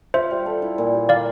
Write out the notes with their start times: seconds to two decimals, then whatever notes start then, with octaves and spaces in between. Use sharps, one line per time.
0.14 F4 C5 E5
0.31 G3
0.46 A4
0.62 E4
0.78 A#2
0.94 G4
1.09 A#3 D5 F5